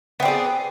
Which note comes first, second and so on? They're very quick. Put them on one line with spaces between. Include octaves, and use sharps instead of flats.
B3 C4 D5 G#4